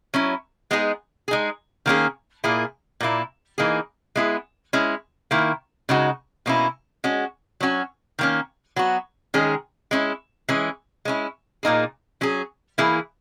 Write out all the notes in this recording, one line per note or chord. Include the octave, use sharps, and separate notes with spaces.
F#3 C#4 E4
G#3 B3 D#4 G#4
G#3 D#4 G#4
D#3 A#3 C#4 G#4
A#2 A#3 E4 G#4
A#2 A#3 E4
E3 A#3 D#4 G#4
G#3 B3 E4 G#4
G#3 C#4 E4
D#3 A#3 E4
C#3 G#3 D#4 F#4
B2 A#3 C#4 E4
G#3 C#4 F#4
F#3 C#4 F#4
D#3 A#3 C#4
F#3 B3 F#4
D#3 G#3 C#4 G#4
G#3 C#4 E4
E3 G#3 C#4 G#4
G#3 C#4 E4
A#2 A#3 D#4 G#4
F#3 C#4 G#4
E3 A#3 E4 G#4